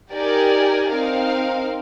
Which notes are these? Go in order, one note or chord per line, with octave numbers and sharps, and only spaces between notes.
D#4 G4 A#4 D5 G#5
C4 D#4 A#4 F5